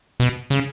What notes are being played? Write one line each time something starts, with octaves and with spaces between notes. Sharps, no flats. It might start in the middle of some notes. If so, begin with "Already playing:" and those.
B2
C#3